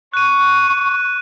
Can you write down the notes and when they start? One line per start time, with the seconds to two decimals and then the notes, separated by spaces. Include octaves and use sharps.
0.14 C#6 F#6 D#7